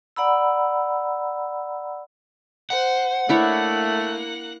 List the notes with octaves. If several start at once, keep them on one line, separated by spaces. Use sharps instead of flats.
D5 F#5 A#5 B5 E6
C5 F#5
A3 A#3 D4 E4 C#5 F#6